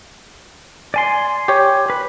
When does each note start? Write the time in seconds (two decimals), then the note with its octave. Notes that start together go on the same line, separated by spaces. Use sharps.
0.94 D5 G#5 C6
1.48 G4 C#5
1.90 B4